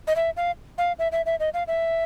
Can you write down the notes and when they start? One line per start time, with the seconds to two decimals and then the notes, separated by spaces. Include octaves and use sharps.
0.07 D#5
0.16 E5
0.37 F5
0.78 F5
0.99 E5
1.12 E5
1.26 E5
1.40 D#5
1.54 F5
1.68 E5